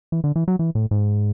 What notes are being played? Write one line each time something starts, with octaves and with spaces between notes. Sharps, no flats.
E3
D3
E3
F#3
E3
A2
G#2